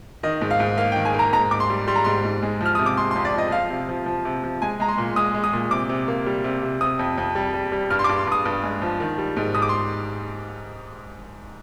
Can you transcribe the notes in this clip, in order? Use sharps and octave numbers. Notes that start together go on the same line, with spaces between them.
D#3 D#5
G#2
F5
G#2
A#3 F5
G5
D#3
G#5
A#3 A#5
G#2 A#5
G#2 D6
C6
G3
G3 C6
A#5
G#2 C6
G#2
G#3
F3 F6
C3 D#6
D6
G#3 C6
C6
F2
D5
F3 D#5
F3 F5
C3
F3
F3
C3
F3
G#3 G#5
G#3 A#5
C6
A#2
G#3 D#6
G#3
D#6
A#2
C3 D6
C3
A#3
G3
C3
C3
C3 D#6
F2
F2
G3
G3
G3
G2 F6
C6
D6
G2
C6
G2 D#6
G2
G#3
F3
D#3
G3
G#2
G#2 D#6
D6
C6